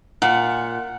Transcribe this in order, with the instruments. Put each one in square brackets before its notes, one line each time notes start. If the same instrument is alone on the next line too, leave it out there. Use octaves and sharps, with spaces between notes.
[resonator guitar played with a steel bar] A#2 [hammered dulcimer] F#5